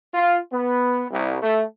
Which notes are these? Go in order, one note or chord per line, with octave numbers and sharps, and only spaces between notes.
F4
B3
C2
A3